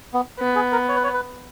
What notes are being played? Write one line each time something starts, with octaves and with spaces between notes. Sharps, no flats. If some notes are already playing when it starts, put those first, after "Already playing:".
B3
B3
G#4
A#4
C#5
B4
C#5
B4